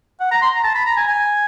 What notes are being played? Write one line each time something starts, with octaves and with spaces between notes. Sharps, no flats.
F#5
A#5
C6
A#5
A5
B5
A#5
G#5
G#5